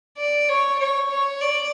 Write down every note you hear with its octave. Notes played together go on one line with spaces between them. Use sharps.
D5
C#5
C#5
C#5
D5